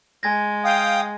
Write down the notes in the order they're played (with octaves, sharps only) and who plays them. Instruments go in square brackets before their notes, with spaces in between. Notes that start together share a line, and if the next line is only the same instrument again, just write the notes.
[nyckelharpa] G#3 [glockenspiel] G#5 G#6 A#6
[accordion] F5 G5 D#6